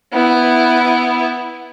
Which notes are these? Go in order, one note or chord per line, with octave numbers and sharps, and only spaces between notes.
B3 E4